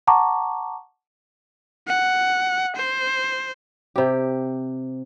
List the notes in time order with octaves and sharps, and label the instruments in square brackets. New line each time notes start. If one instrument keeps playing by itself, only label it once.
[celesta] F#5 A5 A#5 C#6 D6
[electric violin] F#5
C5
[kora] C3 G4